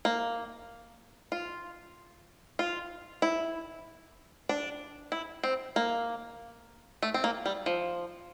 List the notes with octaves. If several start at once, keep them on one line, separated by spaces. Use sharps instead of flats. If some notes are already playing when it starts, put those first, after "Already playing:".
A#3
F4
F4
E4
D4
E4
C4
A#3
A3
C4
A#3
G3
F3